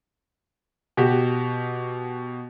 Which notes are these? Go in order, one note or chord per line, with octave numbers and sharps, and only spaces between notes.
B2 F#4 G4